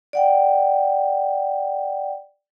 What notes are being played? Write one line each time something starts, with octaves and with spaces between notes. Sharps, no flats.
D5 F#5 G5